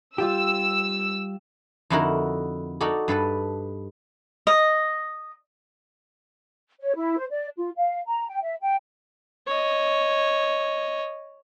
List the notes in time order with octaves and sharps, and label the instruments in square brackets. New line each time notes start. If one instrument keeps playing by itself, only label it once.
[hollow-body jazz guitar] G3 F4 G4 [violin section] E6
[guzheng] F2 D3 D#4 E4 F#4 A#4
D#4 F#4 A4 D5
G2 A4 B4 A5
[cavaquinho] D#5
[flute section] C#5
E4
C5
D5
F4
F5
A#5
G5
E5
G5
[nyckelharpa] C#5 D#5